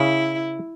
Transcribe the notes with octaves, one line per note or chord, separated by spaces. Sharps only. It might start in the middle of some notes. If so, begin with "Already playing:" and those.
Already playing: C#3 E4